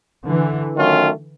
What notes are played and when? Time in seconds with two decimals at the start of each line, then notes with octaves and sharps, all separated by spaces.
0.26 D3 E3
0.75 D#3 F#3 A3 C#4 F4